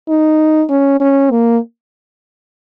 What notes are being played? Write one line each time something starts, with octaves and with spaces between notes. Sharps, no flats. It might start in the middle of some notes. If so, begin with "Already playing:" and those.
D#4
C#4
C#4
A#3